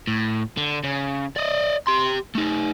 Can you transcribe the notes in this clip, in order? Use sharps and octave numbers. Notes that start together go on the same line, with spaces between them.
A2
D3
C#3
D5 D#5
G4 C6
A3 D#4